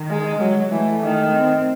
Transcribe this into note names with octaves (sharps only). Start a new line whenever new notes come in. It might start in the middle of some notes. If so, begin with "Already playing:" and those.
Already playing: D#3
G#3
F#3 G#3
E3 A3
D#3
C4